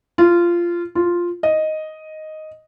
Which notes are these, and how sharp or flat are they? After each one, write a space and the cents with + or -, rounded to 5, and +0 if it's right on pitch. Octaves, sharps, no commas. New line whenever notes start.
F4 -15
F4 +0
D#5 +0